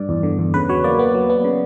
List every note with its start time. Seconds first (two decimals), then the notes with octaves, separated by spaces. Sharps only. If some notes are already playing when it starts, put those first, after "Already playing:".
Already playing: G2 D5
0.09 E2
0.23 D3
0.39 E2
0.54 C#3 B4
0.69 F#3 C#5
0.84 A#3 D5
0.99 B3
1.15 F#3
1.30 B3
1.44 C#3